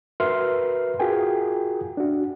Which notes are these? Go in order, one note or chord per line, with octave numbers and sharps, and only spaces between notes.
F#4 A#4 B4 E5 C6 F6
F4 F#4 G#4 A#4 G5 G#5
D4 F#4